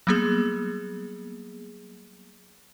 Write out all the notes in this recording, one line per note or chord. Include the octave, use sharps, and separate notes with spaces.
F#3 G3 A#3 B3 G#4